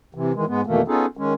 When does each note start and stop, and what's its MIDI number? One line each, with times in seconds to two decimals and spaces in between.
0.15 0.32 48
0.15 0.32 52
0.34 0.45 51
0.34 0.45 52
0.34 0.45 56
0.47 0.61 44
0.47 0.61 56
0.47 0.61 59
0.66 0.81 41
0.66 0.81 47
0.66 0.81 51
0.66 0.81 52
0.66 0.81 57
0.66 0.81 58
0.88 1.06 59
0.88 1.06 61
0.88 1.06 63
0.88 1.06 65
0.88 1.06 68
0.88 1.06 69
1.17 1.34 51
1.17 1.34 56
1.17 1.34 61